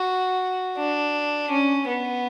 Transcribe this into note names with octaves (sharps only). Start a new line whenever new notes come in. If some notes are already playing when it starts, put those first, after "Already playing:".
Already playing: F#4
D4
C#4
B3